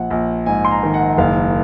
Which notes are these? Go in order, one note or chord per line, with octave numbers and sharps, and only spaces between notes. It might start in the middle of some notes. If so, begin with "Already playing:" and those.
Already playing: A#1 F#5
A#1
G#2 G#5
C6
A#5
D#3
F#5
F#1 F5